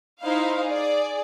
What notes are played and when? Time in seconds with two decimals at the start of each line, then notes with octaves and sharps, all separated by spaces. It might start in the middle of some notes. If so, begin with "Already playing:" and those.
0.21 D#4 E4 C5 F5
0.64 G#4 D5